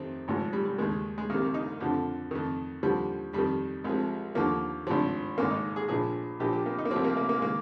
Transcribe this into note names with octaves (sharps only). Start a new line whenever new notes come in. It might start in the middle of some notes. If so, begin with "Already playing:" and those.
Already playing: F2 C3 D#3 C4
G#1 G#2 F3
G3
G3
D#2 D#3 G#3
G#3
C2 C3 D#3 A#3
D#4
F2 D3 F3
F2 D#3
D#2 D3 F3 G3
F2 D#3 G3
C2 C3 F3 G#3
D#2 D3 F3 A#3
G#1 G2 F3 C4
G#1 G#2 D#3 A#3
D#4
G#4
A#1 A#2 F3 G#4
A#1 A#2 F3 G4
G4
A#3
D#4
A#3
C2 C3 F3 C4
A#3
A#3
A#3
G#3
D#3 A#3